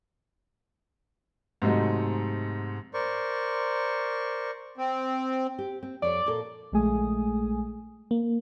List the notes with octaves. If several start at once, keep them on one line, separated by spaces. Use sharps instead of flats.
G#2 C3 F#3 A3 D#4
A#4 C5 D5 C#6
C4
G4
C4
F2 C#5 D5
A#2 A#3 A4
A#1 G#3 A3 G#4 G#5 D#6
A#3